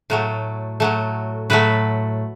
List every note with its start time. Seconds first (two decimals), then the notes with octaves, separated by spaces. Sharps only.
0.10 A2 F#3 A3
0.80 A2 F#3 A3
1.50 A2 F#3 A3 B4